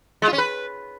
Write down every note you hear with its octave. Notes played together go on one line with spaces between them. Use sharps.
G#3
F4
C#4
B4